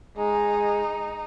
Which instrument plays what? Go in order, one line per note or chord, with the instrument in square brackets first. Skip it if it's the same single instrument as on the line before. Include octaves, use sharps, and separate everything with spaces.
[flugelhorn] G#3 [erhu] D#4